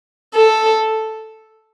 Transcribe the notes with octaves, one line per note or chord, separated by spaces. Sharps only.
A4